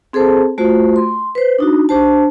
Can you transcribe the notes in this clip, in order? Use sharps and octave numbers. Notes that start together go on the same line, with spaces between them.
C4 G#4 A4 C5 A5
A3 F4 F#4 C5
C6
B4 C5
D4 D#4 F#4
D4 G4 C5 A5